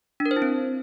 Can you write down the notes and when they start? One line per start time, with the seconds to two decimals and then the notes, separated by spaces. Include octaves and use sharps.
0.20 D4
0.26 A#4
0.31 C5
0.36 E4
0.42 C4